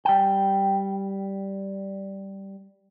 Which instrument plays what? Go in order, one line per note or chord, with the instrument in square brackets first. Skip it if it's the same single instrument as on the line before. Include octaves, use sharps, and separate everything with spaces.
[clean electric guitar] G3 G5